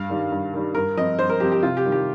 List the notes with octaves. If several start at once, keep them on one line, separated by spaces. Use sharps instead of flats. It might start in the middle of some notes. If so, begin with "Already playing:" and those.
Already playing: G2 F5
D#3 G3
G2
D#3 G3
G2 A#4
F3 C4 D#5
G2 C5
A#4
F3 C4 G4
G4
C3 F4
G4
D#3 G3
G4